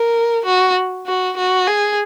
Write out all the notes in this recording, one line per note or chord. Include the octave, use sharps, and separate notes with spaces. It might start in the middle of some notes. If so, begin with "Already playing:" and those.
Already playing: A#4
F#4
F#4
F#4
G#4